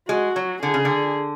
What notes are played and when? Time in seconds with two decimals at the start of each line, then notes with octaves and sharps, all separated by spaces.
0.09 G#3 F#4
0.36 F#3
0.62 D3 G#4
0.74 C#3
0.85 D3